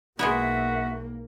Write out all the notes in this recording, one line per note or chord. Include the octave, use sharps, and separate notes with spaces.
B1 G#3 A#3 B3 E4 F#4 E5